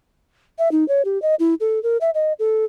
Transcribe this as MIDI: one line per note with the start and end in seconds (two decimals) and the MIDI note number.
0.58 0.71 76
0.71 0.87 63
0.88 1.02 73
1.05 1.21 67
1.22 1.35 75
1.39 1.54 64
1.60 1.82 69
1.83 1.97 70
2.01 2.10 76
2.14 2.33 75
2.39 2.65 69